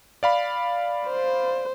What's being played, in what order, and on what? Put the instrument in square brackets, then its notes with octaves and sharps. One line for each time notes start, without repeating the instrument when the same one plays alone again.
[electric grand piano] D5 F5 B5
[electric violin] C5